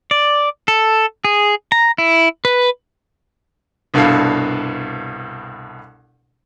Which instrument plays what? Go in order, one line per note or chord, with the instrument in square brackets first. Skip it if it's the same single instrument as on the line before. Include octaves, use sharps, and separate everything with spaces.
[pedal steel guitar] D5
A4
G#4
A#5
E4
B4
[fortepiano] C2 G2 B2 D4 A4 F5